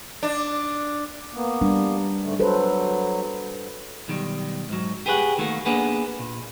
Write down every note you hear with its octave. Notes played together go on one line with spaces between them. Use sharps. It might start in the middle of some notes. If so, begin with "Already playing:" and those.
D4
A#3 B3
G3 D4
G#2 D3 A3
F#3 A4 B4 C5
B1 D#3 G3
G#2 F#3
G4 G#4 B4 C#5 D5 F#5
D#3 A3 A#3 F#4
A#3 B3 D4 G#4 B4 F#5
A#2